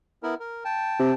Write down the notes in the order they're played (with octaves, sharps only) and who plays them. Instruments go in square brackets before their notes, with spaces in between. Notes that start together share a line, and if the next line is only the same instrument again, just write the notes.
[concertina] B3 E4 A#4
A#4
G5 A5
[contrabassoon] C3